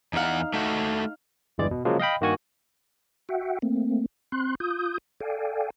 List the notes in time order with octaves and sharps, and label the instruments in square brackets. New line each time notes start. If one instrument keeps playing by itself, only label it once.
[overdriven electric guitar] E2 F#5 [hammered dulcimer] D#4 F5
[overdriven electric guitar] A3 F#4
[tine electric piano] G1 E2 G2 E3 G#3 D5
B2
C#3 F3 F#3 G#3 A#3
D#5 F5 G5 B5
G2 D#3 A#3 F#4 G#5 C#6
[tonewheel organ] F#4 E5 F#5 G5
A3 A#3 C4
C4 C6 F#6
F4 D#6 G6
A4 D5 F5 G5 G#5